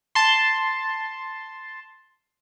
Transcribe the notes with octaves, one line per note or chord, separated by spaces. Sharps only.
A5 C6